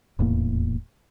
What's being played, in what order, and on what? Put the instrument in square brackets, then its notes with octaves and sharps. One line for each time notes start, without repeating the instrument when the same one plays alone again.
[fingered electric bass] D#1 E2 A2 A#3